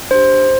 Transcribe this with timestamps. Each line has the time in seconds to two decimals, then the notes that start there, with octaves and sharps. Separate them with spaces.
0.11 D4 G4 C5